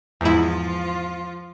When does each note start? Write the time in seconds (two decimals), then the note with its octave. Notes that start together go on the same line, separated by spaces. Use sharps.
0.21 E2 G#2 F3 E4 F4